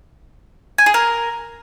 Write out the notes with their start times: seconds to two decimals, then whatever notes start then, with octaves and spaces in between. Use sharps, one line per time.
0.78 G#5
0.86 G#4
0.94 A#4